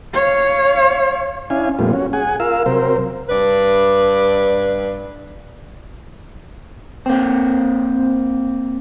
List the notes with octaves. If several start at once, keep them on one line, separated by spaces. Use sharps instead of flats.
C#5 F5
C#4 D4 E4 F5 G#5
F2 A#2 G3 A3 B3 F4
C#4 F#4
G#4 F#5 G#5
F4 A#4 F5 E6
C3 F#3 A#4 C5
G2 D4 B4 D5
A#3 C4